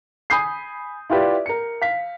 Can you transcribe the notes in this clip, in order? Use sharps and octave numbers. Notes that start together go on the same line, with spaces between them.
G#5 B5 D#6 G6 C7
E4 F4 G4 B4 D5 E5
A#4 C#7
F5 B6